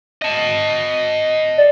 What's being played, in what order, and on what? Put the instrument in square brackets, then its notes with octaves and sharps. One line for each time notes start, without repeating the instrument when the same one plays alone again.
[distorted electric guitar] D#5 A5
[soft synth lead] D5